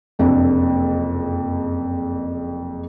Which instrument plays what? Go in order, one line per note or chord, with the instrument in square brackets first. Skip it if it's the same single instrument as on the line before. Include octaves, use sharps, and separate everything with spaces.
[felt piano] F#1 F2 C3 D4